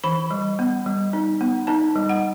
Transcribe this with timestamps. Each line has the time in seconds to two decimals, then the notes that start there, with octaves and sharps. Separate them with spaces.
0.04 E3 B5
0.31 G3
0.59 B3
0.86 G3
1.13 D#4
1.41 B3
1.67 D#4 A5
1.96 G3
2.09 F#5